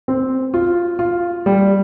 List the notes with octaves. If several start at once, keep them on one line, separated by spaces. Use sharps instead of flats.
C4
F4
F4
G3